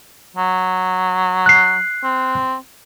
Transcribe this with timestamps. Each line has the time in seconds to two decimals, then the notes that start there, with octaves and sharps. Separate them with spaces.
0.37 F#3
1.46 F#6 C7
2.04 C4